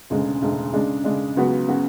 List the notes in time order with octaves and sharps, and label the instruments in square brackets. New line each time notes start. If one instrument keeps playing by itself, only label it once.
[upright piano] E1 D2 C#3 G#3
E1 D2 C#3 G#3
C#3 G#3 D4
C#3 G#3 D4
C#2 C#3 F#3 B3 F#4
C#3 F#3 B3 F#4